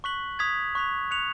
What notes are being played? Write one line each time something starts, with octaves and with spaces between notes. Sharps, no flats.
C#6 F#6 B6 F#7
D#6 G#6 B6 F7
C#6 F#6 B6 F7
F#6 C#7 F7